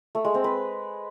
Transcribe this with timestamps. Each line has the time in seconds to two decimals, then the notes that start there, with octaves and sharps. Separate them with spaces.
0.15 A3
0.25 G#3
0.34 C4
0.44 B4